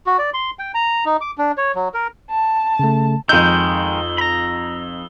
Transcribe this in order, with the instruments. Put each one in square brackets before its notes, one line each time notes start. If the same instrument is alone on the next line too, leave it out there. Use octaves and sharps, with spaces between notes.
[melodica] F#4
D5
C6
G5
A#5
D#4
D6
D4
C#5
F#3
A#4
[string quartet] A5
[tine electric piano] C#3 A3
[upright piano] F2 D#4 [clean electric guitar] D#3 G#3 [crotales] E6 G7 [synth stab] G6
[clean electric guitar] A#5 B5